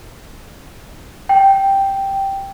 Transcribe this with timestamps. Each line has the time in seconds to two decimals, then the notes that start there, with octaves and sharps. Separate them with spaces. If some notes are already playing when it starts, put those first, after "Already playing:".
1.29 G5